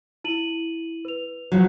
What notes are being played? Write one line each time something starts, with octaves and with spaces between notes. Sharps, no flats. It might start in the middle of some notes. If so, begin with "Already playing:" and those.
E4 D#7 F#7
B4 F7
C#3 F3 F#3